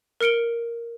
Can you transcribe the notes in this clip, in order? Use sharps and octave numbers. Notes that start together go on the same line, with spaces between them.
A#4 F6 C#7 D7 G7